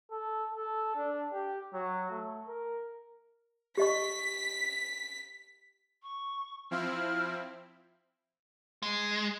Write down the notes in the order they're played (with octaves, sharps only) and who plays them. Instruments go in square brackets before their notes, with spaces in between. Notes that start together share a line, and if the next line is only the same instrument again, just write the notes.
[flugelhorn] A4
A4
D4
G4
F#3
A3
A#4
[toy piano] G4 D#5 C#6 [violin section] B6
[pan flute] C#6
[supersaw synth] F3 C4 E4 [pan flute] F6
[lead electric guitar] G#3